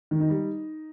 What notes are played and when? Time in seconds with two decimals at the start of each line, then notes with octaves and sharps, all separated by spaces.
0.11 D#3
0.20 D#4
0.29 G3